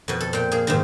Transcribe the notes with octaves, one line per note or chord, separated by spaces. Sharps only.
F2 B2
A4
A#2 G5
A#3 G#4
G#2 C3 D#3